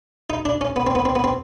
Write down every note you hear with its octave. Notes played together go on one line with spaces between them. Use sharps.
D#4
D4
C#4
B3
C4
B3
C4
B3
C4